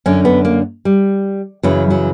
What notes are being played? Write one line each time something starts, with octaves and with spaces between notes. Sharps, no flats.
F#2 D3 C#4
B3
A#3
G3
F#2 C#3 E3 F#3
F#3